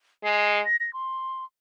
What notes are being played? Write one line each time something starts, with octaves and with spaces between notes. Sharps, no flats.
G#3 C7
A#6
A#6
C6